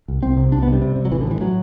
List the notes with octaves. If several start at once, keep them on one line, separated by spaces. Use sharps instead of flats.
C2
C2 C4
C3
C2 D4
B3
C3
G3
C3
C3
F#3
A1 E3
D3
A2 E3
A2 F#3